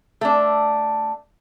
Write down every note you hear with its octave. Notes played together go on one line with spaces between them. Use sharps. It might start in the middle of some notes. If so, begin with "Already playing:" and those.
A3 D4